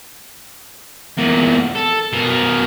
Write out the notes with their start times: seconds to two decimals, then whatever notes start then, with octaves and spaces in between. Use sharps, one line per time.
1.17 E2 A#2
1.75 A4
2.13 B2 A#4